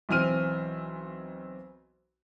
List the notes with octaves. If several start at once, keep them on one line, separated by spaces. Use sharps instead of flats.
B1 E3 C4 F6 D#7